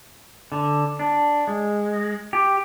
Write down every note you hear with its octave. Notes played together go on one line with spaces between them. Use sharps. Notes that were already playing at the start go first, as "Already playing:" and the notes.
D3
D4
G#3
G4